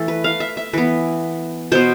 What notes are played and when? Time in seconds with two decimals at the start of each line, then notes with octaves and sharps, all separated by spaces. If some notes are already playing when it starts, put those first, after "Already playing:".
Already playing: E3 A3 A4
0.08 B4
0.24 F5
0.40 E5
0.57 E5
0.73 E3 B3 B4
1.72 B2 B3 C5